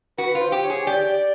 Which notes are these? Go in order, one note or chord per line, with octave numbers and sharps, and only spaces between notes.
F#4 B4
F4
C5
G4
C#5
G#4
G4 D5